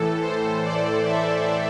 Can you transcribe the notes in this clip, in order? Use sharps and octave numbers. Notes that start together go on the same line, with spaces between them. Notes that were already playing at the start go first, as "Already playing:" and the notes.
Already playing: A2 E3 A4
C5
D5
E5